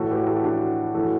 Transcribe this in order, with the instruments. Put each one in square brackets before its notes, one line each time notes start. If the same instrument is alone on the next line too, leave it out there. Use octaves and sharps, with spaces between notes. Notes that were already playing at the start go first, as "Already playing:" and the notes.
Already playing: [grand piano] A2 E3 F#4 A4
G4 B4
F#4 A4
D4 F#4
A2 E3 F#4 A4